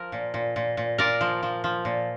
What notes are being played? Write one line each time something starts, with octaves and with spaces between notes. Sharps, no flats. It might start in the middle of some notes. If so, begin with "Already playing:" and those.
Already playing: F3 A#4
A#2
A#2
A#2
A#2
A#2 A#4 D5
F3
F3
F3
A#2